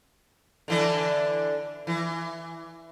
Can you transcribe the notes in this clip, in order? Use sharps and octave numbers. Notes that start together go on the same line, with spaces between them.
D3 E3 D4
E3